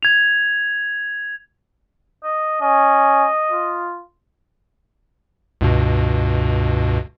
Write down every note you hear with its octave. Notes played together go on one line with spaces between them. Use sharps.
G#6 F7
D#5
C#4 D#5
F4
C#2 G2 B2